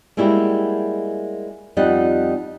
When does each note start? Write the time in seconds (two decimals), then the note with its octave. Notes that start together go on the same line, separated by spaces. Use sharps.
0.17 G3 G#3 A#3 E4 F#4 G4
1.77 F2 G3 D#4 D#5 F#5